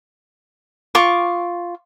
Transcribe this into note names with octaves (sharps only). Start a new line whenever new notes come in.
F4 C#6 D6